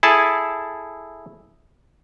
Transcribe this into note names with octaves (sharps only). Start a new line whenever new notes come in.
E4 G#4 A4 A5